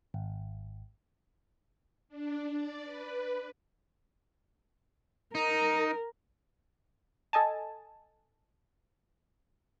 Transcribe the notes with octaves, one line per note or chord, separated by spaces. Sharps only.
G#1
D4
D5
B4
D#4 A#4
A4 D#5 G#5 A5